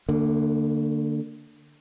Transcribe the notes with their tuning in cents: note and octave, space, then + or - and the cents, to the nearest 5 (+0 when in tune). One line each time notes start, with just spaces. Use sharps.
D3 +10 A#3 -30